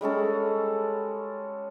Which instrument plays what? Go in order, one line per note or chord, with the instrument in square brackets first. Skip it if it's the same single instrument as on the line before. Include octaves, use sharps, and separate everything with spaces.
[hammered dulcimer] G3 G#3 C#4 A4